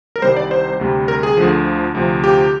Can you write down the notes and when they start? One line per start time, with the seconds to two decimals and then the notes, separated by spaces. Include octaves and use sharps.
0.16 A#4
0.22 C2 C3 D#3 G3 C5
0.37 D5
0.51 C5
0.79 D2 C3 G3
1.08 A#4
1.23 G#4
1.37 D2 D3 F3
1.95 D2 C3 F3
2.24 G4